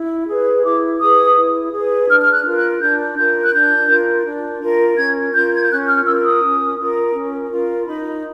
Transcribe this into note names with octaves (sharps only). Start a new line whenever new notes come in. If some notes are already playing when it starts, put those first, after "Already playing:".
Already playing: E4
G#4 B4
E4 D6
G#4 B4 D#6
E4
G#4 B4
D4 F6
F6
F#6
F4 A#4
F#6
D4 G6
F4 A#4 G6
F#6
D4 G6
F4 A#4
D4
F4 A#4
C#4 G#6
F4 A#4 G6
G#6
G6
C#4 F#6
F6
F4 A#4 E6
D#6
C#4
F4 A#4
C#4
F4 A#4
D#4 B5